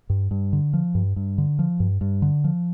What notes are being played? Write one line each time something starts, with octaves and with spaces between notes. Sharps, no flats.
G2
G2
D3
F3
G2
G2
D3
F3
G2
G2
D3
F3